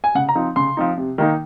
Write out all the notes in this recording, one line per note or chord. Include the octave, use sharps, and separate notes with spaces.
G#5
C#3 F#5
A#5
F3 C4 D#4
C#3 C6
F3 C4 D#4
C3
D#3 A#3 D#4